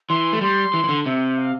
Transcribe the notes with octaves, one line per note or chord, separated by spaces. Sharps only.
E3 C6
A3
G3 C6
E3
E3
D3
C3 E5
F5